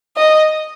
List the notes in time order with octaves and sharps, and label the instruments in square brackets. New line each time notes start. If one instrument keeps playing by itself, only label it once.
[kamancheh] D#5